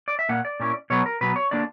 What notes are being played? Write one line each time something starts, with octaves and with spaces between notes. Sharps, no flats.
D5
E5
A#2 A#3 F#5
D5
A#2 A#3 C#4 E4
B2 F#3 B3 C#5
A#4
B2 F#3 B3 B4
C#5
D3 A#3 D4 D5